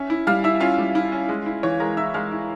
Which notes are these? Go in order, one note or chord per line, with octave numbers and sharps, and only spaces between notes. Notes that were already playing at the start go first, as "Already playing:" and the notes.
Already playing: C#4 E5
E4
G3 F5 F6
E4 E5 E6
C#4 F4 F5
G3
E4
C#4
G#3
E4
E3 C#5
G#3 A#4 A#5
E4 E5 E6
G#3 F5 F6
E4